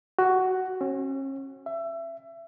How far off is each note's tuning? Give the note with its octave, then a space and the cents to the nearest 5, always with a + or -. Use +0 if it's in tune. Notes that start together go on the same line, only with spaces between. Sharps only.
F#4 +10
C#4 -40
E5 +25